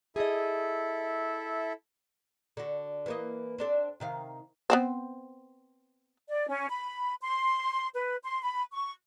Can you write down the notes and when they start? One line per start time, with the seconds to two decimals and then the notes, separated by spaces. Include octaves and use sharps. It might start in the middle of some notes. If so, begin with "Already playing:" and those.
0.16 E4 G#4 A4 D#5 E5
2.57 D3 F#4
3.06 E3 A#3 D#5
3.58 C4 D4 A4
4.00 C3 D#3 F5
4.70 B3 C4 C5
6.28 D5
6.48 C#4
6.69 B5
7.21 C6
7.94 B4
8.24 C6
8.42 B5
8.71 C#6